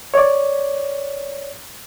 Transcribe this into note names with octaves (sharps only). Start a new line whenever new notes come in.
C#5 D5